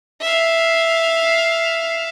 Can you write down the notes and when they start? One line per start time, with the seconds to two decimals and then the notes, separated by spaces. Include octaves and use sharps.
0.21 E5 F5